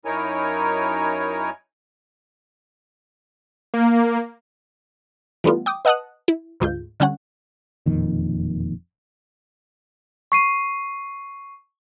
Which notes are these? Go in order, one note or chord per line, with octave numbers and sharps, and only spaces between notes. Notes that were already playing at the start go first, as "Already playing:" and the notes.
F#2 D#4 E4 A#4 C#5 G#5
A#3
E3 G3 A3 B3 F4
G5 D6 D#6
B4 D#5 F#5 A5 D#6 F#6
E4
D2 G#2 F4 G6
D3 G3 C#4 F#5
E1 F2 A#2 D#3
C#6 C7 D#7